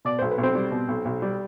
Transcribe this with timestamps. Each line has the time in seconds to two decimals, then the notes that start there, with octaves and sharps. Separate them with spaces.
0.05 B2 D5
0.19 B1 C5
0.31 B4
0.38 B1
0.43 C4 C5
0.55 G3
0.71 B2
0.88 B1
1.05 B1
1.22 G3